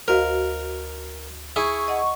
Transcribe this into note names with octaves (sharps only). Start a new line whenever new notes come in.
D2 F#4 A#4 C5 D#5 F5
E4 G#4 C#6
D#5 F#5